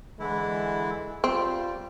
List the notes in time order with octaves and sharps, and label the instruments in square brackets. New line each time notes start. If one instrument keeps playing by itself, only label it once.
[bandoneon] D3 E3 E4 [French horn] G#3
[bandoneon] G3 [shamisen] C4 [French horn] F4